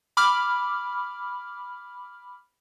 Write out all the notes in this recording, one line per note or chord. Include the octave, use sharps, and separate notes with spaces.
B5 D6 F6